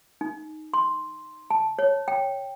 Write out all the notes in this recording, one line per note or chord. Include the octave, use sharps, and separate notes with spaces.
D#4
C6
A5
C#5
G5